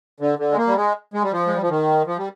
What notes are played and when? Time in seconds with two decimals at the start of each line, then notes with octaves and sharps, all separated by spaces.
0.20 D3
0.39 D3
0.51 G#3
0.57 A#3
0.67 G3
0.76 G#3
1.14 G#3
1.23 G3
1.32 F3
1.47 G#3
1.55 G3
1.62 F3
1.69 D#3
2.06 F3
2.18 G3